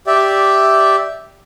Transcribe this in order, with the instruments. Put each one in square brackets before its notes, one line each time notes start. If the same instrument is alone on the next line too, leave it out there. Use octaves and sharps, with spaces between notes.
[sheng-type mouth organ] G4 D5 E5